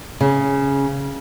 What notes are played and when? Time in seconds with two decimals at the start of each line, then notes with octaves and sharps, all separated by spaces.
0.21 C#3